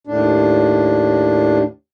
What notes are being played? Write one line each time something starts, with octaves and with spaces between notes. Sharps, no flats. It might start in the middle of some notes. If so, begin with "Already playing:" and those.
D#2 A2 D4